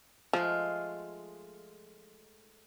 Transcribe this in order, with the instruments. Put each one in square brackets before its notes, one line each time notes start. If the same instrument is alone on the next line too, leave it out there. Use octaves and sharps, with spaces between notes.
[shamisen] F3 [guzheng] G#3 A3 F4